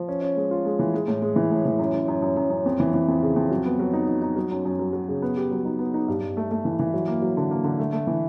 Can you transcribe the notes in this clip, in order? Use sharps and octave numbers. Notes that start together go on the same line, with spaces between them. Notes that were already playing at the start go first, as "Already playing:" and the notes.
Already playing: F3
C#4
C#4
G#3
F4
G#3
E3
G#3
A2
G#3
E3
A2
E3
F#2
F#2
F#2
F#2
F#2
F#2
F2
E3
E3
F2
C#3
F2
F#3
B3
F#3
D#4
D#4
D#4
F#3
F#2
F#2
F#3
F#3
C#3
B3
G4
F#3
D#4
B3
D#4
G2
G2
A3
A3
E3
E3
F#3
A#3
F#3
D3
A#3
D3
A3
A3
E3